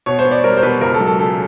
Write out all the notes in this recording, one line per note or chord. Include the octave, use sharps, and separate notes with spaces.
B2 C#5
C5
B3
D5
G3 A#4
C5
B2 B4
C#2 A#4
A4
F#3
A4
C#3 A4